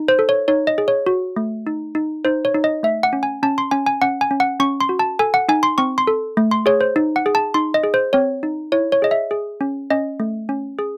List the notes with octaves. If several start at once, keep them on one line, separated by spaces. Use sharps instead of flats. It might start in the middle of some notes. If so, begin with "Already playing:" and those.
Already playing: D#4
C5
A4
C#5
D#4 C#5
D#5
G#4
C#5
F#4
A3
D#4
D#4
D#4 C5
C#5
D#4
D#5
A3 E5
F#5
C#4
G#5
C#4 A5
C6
C#4 G#5
G#5
C#4 F#5
G#5
C#4
F#5
C#4 C#6
C6
F#4
A5
A4 G#5
F#5
D#4 G#5
C6
C4 C#6
C6
A4
A3
C6
G#4 C#5
C5
D#4
F#5
G#4
A5
D#4 C6
D#5
G#4
C5
C4 C#5
D#4
E4 C#5
C#5
G#4 D#5
E5
G#4
C#4
C#4 D#5
A3
C#4
G#4